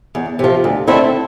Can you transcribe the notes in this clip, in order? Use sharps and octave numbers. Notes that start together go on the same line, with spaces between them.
E2
C3 F3
D2
D3 A3 C4 E4